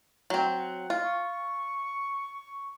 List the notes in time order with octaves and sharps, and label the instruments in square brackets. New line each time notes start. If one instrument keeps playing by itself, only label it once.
[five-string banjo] F#3 C4
[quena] F#5
[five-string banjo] F4
[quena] C#6